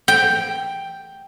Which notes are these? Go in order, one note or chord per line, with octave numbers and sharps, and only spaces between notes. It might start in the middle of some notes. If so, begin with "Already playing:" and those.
G5